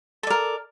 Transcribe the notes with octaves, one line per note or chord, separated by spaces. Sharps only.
A4 A#4 D5